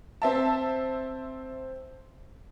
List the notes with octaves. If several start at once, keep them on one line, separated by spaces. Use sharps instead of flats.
C4 E5 A5